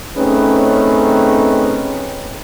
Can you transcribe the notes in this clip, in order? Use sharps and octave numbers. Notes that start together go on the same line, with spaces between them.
A3 C4 C#4 D#4 G#4 B4